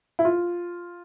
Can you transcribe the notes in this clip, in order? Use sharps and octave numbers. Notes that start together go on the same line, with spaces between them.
E4
F4